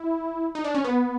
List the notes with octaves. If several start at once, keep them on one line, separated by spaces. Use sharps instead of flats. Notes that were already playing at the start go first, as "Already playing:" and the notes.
Already playing: E4
D#4
D4
C#4
B3